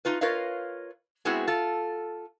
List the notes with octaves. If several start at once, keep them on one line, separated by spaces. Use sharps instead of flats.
D#4 F4 B4
F4 A#4 B4 C#5 D#5 F5
G#3 B3 C4 E4 F#4 G#4
F4 A4